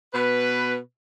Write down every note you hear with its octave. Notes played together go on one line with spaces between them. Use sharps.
B2 B4